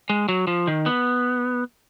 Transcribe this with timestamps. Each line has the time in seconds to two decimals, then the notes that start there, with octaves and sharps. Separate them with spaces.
0.10 G#3
0.29 F#3
0.47 F3
0.67 D#3
0.86 B3